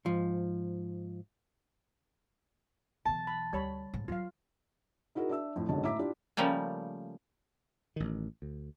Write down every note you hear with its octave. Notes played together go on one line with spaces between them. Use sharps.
G#2 F3
B1 E3 A5
B5
D2 G3 C#5 B5
G#2
F#3 E4 F4 F5
D#4 E4 F#4 G#4 A#4
D4 E5 E6
F2 A2
F#1 B1 G#2 D3 C#5 A5
A2 E5 A#5 D6 B6
D4 E4 F4 G4
C#3 F3 G3 A3 A#3
A1 D#3
D2